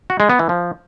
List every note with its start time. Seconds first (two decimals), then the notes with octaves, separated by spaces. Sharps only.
0.10 F#4
0.20 G#3
0.30 B3
0.39 E3
0.49 F3